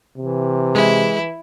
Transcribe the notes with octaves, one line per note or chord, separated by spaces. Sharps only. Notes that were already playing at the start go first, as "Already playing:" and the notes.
C3 E3
G#3 E4